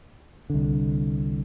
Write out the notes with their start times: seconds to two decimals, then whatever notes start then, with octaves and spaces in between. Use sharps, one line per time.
0.50 C2 D3